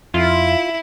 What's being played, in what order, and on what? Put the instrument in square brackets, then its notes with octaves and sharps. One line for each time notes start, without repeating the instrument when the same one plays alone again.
[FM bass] F2 [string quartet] E4 [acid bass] F4